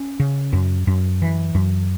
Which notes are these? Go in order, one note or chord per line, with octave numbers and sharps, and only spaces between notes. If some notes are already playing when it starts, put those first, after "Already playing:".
Already playing: C#4
C#3
F#2
F#2
E3
F#2